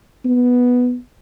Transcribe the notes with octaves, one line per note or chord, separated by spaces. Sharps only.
B3